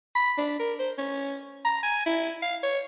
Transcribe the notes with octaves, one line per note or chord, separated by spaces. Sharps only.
B5
D4
A#4
C5
C#4
A#5
G#5
E4
F5
C#5